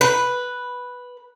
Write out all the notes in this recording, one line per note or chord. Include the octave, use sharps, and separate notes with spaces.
B4